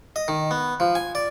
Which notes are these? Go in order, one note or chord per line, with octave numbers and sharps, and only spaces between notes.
D#5
D#3
B3
F3
G#5
D5